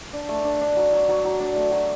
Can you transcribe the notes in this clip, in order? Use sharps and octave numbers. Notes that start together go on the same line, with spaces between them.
D4
A3
D4
D4
F#3
F#3
F#3
F#3
D4
A3
F#3